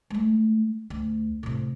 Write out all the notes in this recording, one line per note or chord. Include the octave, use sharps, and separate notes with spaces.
G#3 A3
D2
A2 C3